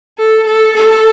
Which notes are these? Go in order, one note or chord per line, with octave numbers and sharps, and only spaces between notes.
A4
A4
A4